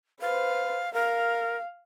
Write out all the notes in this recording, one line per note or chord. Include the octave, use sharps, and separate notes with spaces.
B4 C5 F5
A#4 F5